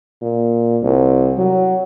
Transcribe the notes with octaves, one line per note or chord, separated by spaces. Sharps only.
A#2
C2
F#3